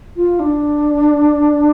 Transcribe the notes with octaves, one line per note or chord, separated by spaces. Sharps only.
F4
D4